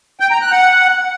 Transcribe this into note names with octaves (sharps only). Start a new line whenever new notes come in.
G5
A#5
F#6
F#5